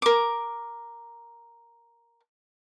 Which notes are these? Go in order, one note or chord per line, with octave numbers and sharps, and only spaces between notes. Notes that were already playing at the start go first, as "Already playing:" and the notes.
A#4 D6